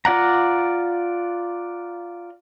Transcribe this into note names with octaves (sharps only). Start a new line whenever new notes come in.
F4 D5 F#5 A#5